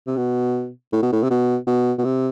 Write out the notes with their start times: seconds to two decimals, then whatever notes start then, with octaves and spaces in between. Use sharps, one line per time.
0.07 C3
0.17 B2
0.93 A2
1.02 B2
1.13 A2
1.23 C3
1.30 B2
1.67 B2
1.98 B2
2.05 C3